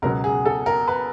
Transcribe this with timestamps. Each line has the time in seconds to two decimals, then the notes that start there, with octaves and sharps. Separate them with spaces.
0.02 C#2 B2 F#3 B3 A#4
0.24 G#4
0.45 A4
0.66 A#4
0.88 B4